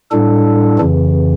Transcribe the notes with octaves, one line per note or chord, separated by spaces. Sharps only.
A2 G3 D4 A4
F2 C#3 E3